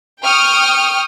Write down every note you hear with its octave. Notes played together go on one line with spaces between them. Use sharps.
G5 C#6 D#6 F6